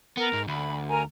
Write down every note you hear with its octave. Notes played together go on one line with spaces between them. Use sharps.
B3 A#4
G#2
D2 B5
A#4 G#5 A#5